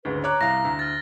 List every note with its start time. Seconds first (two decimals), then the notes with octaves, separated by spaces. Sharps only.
0.05 D2 G#2 C#3 B4
0.24 C#5 A#5 D6 F#6
0.41 C2 F5 A#6
0.65 D2
0.79 F6 A6